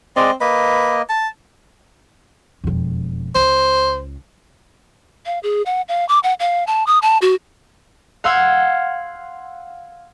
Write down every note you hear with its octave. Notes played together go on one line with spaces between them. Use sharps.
G#3 C4 D5 D#5
A#3 B4 D#5
A5
E1 F2
C#2 C5
F5
G#4
F#5
F5
D6
F#5
F5
A5
D#6
A5
F#4
F5 F#5 C6 E6 G#6